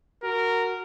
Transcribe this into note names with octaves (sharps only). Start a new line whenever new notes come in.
F#4 A#4